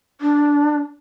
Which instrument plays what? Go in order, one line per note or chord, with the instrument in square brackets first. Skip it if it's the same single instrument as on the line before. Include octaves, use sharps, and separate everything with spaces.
[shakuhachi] D4